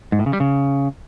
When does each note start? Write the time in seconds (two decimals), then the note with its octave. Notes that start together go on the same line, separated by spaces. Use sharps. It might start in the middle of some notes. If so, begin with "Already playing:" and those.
0.12 G#2
0.19 A2
0.26 C#3
0.33 G3
0.40 C#3